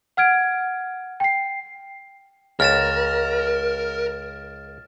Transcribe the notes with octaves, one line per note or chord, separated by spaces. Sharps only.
F#5 F6 G#6 D7
G5 C7
C#2 A#4 F6 A6 E7